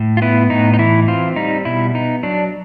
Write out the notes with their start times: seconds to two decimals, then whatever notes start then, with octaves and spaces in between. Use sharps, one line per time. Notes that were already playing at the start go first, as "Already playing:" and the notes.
Already playing: A2
0.17 F4
0.22 B3 E4
0.50 A2 D#4
0.74 D#4
0.79 E3 E4
1.08 C4 F4
1.36 G3 D#4
1.65 B2 E4
1.94 B3 D#4
2.23 F#3 D4